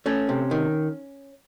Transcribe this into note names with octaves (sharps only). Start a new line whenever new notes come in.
A3 C#4
C3
D#3